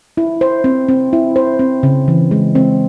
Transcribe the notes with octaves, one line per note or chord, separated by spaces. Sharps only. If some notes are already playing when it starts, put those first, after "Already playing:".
E4
C5
C4
C4
E4
C5
C4
C#3
E3
G#3
C4